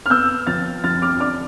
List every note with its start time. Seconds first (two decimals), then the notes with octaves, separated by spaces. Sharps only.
0.06 F6
0.10 B3 E6 G6
0.47 F3 F6 A6
0.84 F3 F6 A6
1.02 D6 F6
1.20 D4 D6 F6